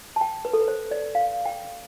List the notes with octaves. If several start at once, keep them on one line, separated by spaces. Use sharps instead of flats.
A5
G5
B4
A4
B4
C5
D5
F5
G5